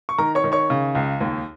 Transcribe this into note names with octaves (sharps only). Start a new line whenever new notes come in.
C#6
D#3 A#4 A#5
C#5 C#6
D#3
C#5 C#6
C#3
C#2
D#2